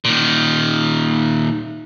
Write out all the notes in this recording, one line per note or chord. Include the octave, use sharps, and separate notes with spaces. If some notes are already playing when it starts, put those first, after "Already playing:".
A#2 D#3